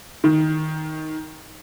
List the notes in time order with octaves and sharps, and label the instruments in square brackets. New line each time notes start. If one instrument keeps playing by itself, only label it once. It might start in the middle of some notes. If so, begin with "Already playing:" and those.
[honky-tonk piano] D#3